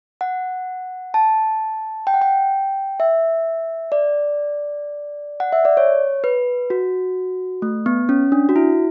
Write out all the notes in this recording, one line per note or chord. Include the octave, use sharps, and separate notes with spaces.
F#5
A5
G5
F#5
G5
E5
D5
F#5
E5
D5
C#5
B4
F#4
A3
B3
C#4
D4
F#4
E4